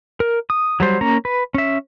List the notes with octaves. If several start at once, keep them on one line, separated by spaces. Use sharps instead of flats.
A#4
D#6
F#3 G3 C5
A#3 C#4 A#5
B4
C#4 E5